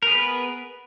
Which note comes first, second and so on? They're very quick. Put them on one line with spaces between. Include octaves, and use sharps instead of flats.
A#4 G#4 B4 B3